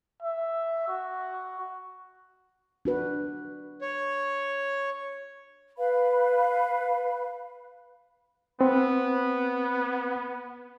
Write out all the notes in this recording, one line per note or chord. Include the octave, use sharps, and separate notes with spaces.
E5
F#4
D4 F#4 B4
C#5
B4 F5 B5
B3 C4